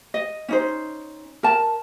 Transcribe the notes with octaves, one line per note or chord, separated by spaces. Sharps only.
D#5
C#4 D#4 C5
A#4 A5